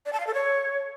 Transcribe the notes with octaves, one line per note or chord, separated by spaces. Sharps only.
D5
A5
F5
A4
C#5